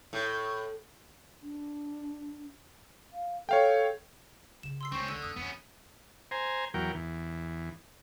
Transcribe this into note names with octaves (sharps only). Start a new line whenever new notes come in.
A2
D4
F5
A4 C#5 F5 G5
C#3 E7
C6 E6 C7
C#2 A3 C4 C#4 C#6
D3 E6
F2 A#3 D#6 E6
F2 E3 B3 C#4
C5 G#5 A#5
E2 F#3 A#4 G5
E2